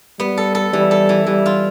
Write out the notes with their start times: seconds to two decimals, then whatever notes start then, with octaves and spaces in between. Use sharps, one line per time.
0.19 G3 B3
0.38 A4
0.55 A4
0.73 E3 G3
0.91 A4
1.09 E3
1.27 E3 G3
1.46 F4